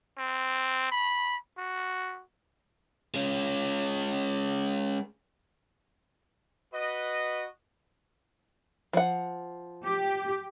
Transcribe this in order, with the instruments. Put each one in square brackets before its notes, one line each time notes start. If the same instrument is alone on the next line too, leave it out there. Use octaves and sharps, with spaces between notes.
[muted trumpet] C4
B5
F#4
[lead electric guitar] G#3 C#4
[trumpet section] F#4 B4 D#5
[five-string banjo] F3 F#5
[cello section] G4